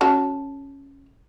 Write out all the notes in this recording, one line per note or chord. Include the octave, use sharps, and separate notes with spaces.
C#4 F#4 A4